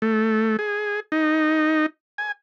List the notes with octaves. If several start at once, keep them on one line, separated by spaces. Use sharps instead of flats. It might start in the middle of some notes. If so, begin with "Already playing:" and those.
A3
G#4
D#4
G#5